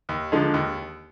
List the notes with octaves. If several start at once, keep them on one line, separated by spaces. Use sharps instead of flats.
D#2
D3 F3 G#3 D#4
D#2